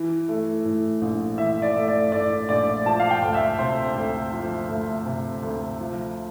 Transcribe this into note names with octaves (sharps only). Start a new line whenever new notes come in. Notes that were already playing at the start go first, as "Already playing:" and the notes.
Already playing: E3
A3
A2
A#1
E3 E5
D5
A3
D5
A2 D5
A#1 D5
F3 A5
F5
G5
D2
E5
C3 C5
D2
F3
D2
C3
D2
F3